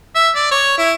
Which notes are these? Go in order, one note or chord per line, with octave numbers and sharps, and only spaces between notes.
E5
D5
C#5
E4